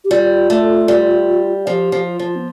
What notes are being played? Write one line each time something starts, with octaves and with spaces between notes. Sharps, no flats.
G4
G3 F4
A3
G3
F3 G4
F3
F4
F3
B3